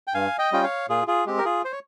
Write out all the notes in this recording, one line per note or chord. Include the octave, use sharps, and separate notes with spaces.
G5
G2 F5 G#5
D#5 G5
G3 C#4 F4 G5
C#5 F5
A#2 F4 G#4
F4 G#4
G#3 C4 G4
A#4
F4 G#4
C5
C#5